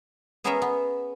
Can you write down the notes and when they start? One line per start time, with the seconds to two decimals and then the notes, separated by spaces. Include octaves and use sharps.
0.44 B3 C#4 G#4 A#4 C#5 E5
0.62 B3